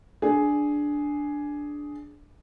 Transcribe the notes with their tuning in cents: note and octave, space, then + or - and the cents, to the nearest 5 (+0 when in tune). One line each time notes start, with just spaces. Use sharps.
D4 +0 G#4 +5